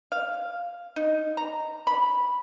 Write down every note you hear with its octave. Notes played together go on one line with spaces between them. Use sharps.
F5
D#4
A#5
B5